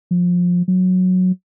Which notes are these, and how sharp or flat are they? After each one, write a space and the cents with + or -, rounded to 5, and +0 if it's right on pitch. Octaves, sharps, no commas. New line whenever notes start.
F3 +20
F#3 -10